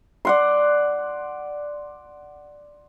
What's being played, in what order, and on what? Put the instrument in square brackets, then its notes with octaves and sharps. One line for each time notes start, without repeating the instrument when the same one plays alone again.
[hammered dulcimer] D5 F#5 C6